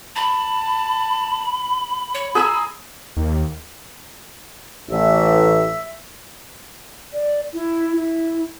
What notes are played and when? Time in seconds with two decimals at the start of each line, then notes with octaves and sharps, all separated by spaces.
0.16 A5 B5
2.14 C#5
2.35 G#4 G#5 A#5 E6
3.17 D#2
4.90 A1 E5
7.13 D5
7.53 E4
7.96 E4